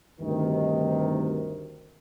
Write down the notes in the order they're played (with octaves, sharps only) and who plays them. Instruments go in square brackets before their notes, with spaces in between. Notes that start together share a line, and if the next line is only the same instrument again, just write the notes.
[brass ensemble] D2 G2 C3 D#3